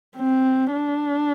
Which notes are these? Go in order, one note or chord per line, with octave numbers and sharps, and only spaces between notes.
C4
D4